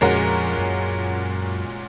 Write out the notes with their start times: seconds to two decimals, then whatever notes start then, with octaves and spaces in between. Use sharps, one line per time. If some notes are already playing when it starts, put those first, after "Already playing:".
0.01 F2 A#2 G#3 C#4 F#4 A#4
0.58 F#2